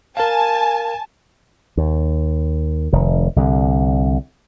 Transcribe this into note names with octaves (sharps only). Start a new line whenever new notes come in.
A#4 F5 G#5 A5
D#2
F1 D#3
C2 D3